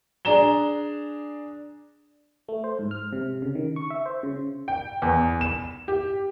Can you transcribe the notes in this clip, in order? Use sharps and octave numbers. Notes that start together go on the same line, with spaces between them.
D4 G#4 D5 A#5 E7 G7
A3
C5
G#2
F6
C3
C#3
D#3
C#6
E5
C5
C#3
G5
E2
E7
G4